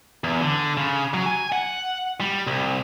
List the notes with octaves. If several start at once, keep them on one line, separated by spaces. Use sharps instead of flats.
E2
D3
C#3
F#3
G#5
F#5
G3
C2